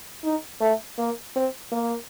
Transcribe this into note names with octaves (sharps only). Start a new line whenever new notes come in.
D#4
A3
A#3
C4
A#3